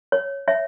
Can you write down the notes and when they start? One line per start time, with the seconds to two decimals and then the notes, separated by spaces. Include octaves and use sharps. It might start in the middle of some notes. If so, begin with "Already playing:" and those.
0.12 C#5
0.48 C#5 E5